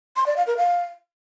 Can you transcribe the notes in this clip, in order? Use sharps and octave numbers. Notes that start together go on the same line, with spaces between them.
C6
D5
F5
A#4
F5